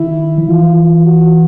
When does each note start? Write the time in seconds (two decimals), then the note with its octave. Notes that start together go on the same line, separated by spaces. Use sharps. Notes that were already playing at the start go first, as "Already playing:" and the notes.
Already playing: D#3 E4
0.38 F3
0.48 E3 F4
0.77 F4
1.06 F#4